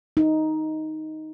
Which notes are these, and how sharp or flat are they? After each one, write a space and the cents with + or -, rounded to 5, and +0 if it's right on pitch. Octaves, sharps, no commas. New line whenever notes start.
D#4 +5